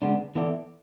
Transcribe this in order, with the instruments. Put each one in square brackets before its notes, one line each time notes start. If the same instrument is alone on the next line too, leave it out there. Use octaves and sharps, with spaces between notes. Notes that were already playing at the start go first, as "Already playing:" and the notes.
[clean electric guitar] C#3 G#3 B3 D4
E3 B3 E4 A4 D5